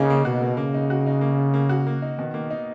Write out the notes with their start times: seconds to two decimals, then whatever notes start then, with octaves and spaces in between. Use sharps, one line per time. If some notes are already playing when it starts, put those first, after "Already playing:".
Already playing: C#3 A#3 D#4
0.10 A#3
0.25 B2 F#4
0.42 A#3
0.57 C#3 A#3
0.74 D#4
0.90 F#4
1.06 D#4
1.21 A#3
1.38 D#4
1.54 A#3
1.69 F#4
1.87 A#3
2.02 D#4
2.18 B2 D#3
2.34 A#3
2.50 D#4